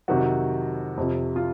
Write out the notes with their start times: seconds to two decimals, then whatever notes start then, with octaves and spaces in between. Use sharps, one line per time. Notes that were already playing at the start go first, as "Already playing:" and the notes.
0.08 F2 C3 D#3 F#3 F#4
0.97 F2 C3 F3
1.36 F4